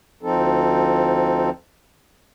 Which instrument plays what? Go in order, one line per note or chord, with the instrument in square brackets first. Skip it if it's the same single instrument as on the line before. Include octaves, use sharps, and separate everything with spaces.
[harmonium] D2 F3 C4 D#4 A4